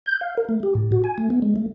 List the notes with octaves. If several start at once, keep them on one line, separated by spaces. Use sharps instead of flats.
G6
F5
A#4
A3
G4
A2
F#4
G#5
A3
B3
G#3
A3